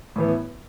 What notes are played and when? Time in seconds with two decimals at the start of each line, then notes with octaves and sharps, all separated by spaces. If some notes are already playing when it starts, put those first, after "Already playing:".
0.16 A2 E3 B3